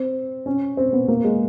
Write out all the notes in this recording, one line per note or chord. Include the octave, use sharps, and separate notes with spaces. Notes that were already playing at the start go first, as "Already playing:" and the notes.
Already playing: C4
C#4
C4
B3
A#3
G#3